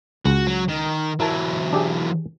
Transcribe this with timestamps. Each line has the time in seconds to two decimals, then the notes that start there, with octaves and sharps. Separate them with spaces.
0.26 C#2 F#4
0.47 F#3
0.69 D#3
1.20 E3 F#3 E4 A#4 A5
1.73 D4 G4 G#4